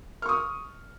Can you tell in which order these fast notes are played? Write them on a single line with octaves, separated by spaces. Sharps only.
F6 C#6 D#6